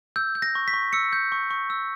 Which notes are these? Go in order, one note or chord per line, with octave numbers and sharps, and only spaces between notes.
E6 G6
G6
A#6
C#6
B6
C#6
E6 C#7
G6
C#6
C#6
E6